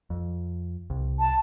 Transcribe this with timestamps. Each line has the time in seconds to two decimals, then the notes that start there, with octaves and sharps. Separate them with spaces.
0.10 F2
0.90 C2
1.20 A5